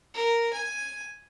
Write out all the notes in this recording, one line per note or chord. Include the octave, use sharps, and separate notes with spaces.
A#4
G#5